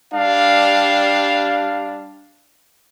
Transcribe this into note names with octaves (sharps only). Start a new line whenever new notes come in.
G3 D4 F5